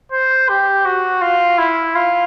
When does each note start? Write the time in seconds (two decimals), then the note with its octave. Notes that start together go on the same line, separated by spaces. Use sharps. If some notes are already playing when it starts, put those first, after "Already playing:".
0.12 C5
0.49 G4
0.85 F#4
1.21 F4
1.58 E4
1.95 F4